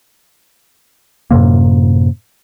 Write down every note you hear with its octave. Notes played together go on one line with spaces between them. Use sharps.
F#2 A2 C3 A#3